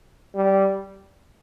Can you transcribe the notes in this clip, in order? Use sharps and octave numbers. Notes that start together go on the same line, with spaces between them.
G3